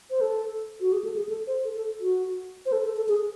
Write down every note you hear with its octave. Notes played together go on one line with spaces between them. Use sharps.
C5
A4
F#4
G#4
A4
G#4
A4
C5
A4
A4
F#4
C5
A4
A4
A4
G#4